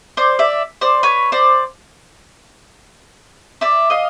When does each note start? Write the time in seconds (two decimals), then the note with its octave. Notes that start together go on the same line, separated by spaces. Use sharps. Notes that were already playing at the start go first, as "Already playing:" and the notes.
0.17 C5 D5
0.39 D5 E5
0.81 C5 D5
1.03 B4 C#5
1.32 C5 D5
3.61 D5 E5
3.90 D#5 F5